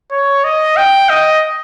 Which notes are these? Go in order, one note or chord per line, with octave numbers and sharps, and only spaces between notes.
C#5
D#5
G5
D#5